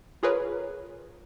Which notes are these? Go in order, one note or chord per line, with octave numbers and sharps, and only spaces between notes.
F4 G#4 A#4 B4 C#5